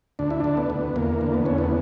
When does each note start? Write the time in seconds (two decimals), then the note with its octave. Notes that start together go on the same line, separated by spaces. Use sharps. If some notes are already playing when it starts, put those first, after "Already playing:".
0.19 D2 D4
0.31 E4
0.40 D3 D4
0.57 B3
0.70 D2
0.96 E2 A#3
1.21 D3
1.34 B3
1.45 E2 C#4
1.58 B3